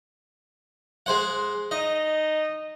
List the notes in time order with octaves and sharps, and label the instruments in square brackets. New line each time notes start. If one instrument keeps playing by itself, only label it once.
[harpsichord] G#3 C5 F#5
[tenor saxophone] D#4 [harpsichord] D#5